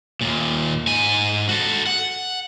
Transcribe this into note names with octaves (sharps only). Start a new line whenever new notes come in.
D#2 A#2
G#2 G#5
F#4 A4
F#5